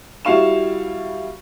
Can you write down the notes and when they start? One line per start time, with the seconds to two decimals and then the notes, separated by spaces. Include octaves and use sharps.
0.25 G3 E4 F#4 F5 C#6 E7